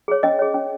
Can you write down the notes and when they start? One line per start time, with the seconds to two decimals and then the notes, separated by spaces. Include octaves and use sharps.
0.08 G#4 C#5
0.23 C#4 D#5
0.39 G#4 C#5
0.54 C#4